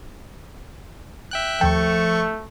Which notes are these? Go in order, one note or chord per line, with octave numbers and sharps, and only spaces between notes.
E5 G5 F#6
D#2 F3 A3 A4 G5 C#6